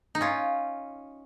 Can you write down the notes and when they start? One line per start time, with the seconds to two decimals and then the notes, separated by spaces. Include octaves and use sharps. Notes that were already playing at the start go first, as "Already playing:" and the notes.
0.15 D#4
0.21 C#4 F4